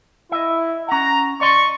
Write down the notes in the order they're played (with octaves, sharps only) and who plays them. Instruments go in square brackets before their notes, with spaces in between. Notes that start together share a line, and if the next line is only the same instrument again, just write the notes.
[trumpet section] E4 [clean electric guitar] D#5 E5
[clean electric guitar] C#4 F#5 [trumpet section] A#5
[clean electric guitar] D5 D#5 C6 [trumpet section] C#6